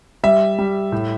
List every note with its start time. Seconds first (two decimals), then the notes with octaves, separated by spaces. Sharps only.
0.23 G3 E5
0.58 G3
0.92 A2